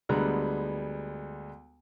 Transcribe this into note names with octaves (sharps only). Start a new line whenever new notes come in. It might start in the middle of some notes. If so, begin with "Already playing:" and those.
D2 G3 G#3 B3 A#5 F#6